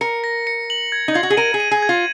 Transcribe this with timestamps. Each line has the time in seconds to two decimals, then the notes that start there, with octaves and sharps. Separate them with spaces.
0.01 A#4 C#7
0.24 A#6
0.47 C#7
0.70 F#7
0.92 G#6
1.08 D#4
1.14 F4 G#6
1.23 F#4
1.30 G#4
1.37 A#4 D#7
1.54 G#4
1.60 D#7
1.71 G#4
1.82 G#6
1.89 F4